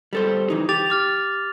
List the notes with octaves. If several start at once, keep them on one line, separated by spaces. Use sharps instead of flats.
G3 A4 C5
E3 D#4
G4 D6 A6 F7
D6 F6 A6